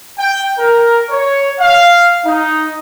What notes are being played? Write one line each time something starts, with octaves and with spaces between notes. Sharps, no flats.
G5
A#4
C#5
F5
D#4